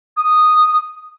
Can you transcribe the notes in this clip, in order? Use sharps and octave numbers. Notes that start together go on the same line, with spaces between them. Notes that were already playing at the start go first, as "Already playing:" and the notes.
D#6